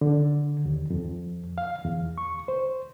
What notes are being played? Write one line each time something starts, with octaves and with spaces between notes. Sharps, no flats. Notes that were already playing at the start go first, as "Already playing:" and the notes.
D3
D#2
F2
F5
E2
C#6
C5